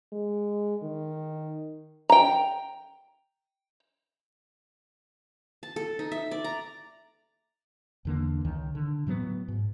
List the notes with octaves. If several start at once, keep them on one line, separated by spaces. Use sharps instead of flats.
G#3
D#3
G5 A#5
A5
A4
D#4
E5
D5
A#5
E2 D3 A#3
C#2 D#3
D3
A2 F#3 A3 B3
G#2